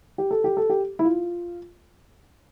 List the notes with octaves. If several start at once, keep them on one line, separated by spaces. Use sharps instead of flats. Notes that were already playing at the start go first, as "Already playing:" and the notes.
G4
A4
G4
A4
G4
E4
F4